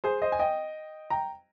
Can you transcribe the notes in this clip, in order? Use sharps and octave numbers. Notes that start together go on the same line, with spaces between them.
G#4 C5
C5 D#5
G#5
D#5 G5
G5 A#5